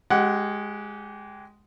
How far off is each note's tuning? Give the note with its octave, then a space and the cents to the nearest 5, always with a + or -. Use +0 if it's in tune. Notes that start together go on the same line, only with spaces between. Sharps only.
G#3 +0 G4 -25 F#5 +0